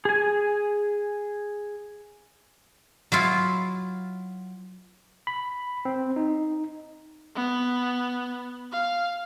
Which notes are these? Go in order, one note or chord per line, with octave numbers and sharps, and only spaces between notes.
G#4 G#5
F#3 E4 F4
B5
C4
D#4
B3
F5